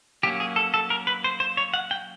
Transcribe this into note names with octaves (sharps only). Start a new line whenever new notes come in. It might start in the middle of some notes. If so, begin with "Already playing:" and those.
F#3 A#3 C#4 G4
G#4
A4
A4
A#4
B4
C5
C5
C#5
F#5
G5